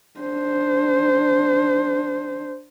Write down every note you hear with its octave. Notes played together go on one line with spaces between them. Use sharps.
D4 C5